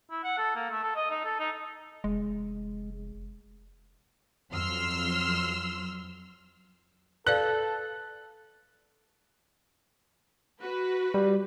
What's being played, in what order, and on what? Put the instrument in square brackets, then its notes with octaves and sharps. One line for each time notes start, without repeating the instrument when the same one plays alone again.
[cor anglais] E4
F#5
A4
A#3
A3
A4
D#5
D#4
A4
D#4
[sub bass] F1 [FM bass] G#3
[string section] F2 F#3 C6 E6 F6
[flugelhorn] A4 [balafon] B4 D5 F5 [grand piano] F#6
[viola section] F#4 B4
[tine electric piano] G3